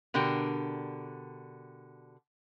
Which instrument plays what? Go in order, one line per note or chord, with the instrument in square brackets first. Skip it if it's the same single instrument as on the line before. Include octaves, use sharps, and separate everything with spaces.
[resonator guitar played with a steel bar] B2 D3 D4 G4 A#4